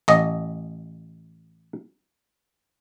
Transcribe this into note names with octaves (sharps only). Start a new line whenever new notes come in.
A1 D#5